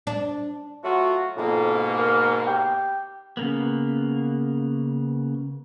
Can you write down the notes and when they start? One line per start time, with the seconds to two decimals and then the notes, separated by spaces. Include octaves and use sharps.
0.07 D4
0.84 F#3 A3 F4 F#4
1.37 F2 G#2 B2 A#3
1.98 A#4
2.47 G4
3.37 C#3 A#3 B3